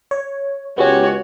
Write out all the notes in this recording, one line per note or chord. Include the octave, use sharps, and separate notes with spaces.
C#5
C#2 G#3 B3 C#4 F#4 G4 C#5